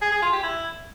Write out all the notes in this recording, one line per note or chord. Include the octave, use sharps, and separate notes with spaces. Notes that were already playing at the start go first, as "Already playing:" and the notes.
G#4
G#4
F4
G4
E4